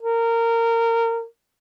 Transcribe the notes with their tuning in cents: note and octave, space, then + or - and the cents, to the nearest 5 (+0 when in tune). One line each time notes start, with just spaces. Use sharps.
A#4 -20